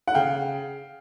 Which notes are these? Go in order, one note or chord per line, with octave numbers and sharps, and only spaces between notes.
F#5
C#3 F5 G5